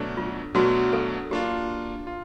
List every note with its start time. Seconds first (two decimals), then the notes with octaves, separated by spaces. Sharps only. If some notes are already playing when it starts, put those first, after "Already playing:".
Already playing: B2 F#3 A3 D4
0.17 F4
0.55 B2 F#3 A3 D4 F#4
0.93 A4
1.31 A#3 D4 F4 G4
2.07 F4